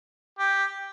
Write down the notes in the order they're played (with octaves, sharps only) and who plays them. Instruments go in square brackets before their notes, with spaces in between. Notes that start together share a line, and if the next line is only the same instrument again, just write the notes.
[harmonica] G4